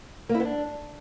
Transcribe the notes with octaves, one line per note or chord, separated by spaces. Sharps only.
A#3
E4
B3
D4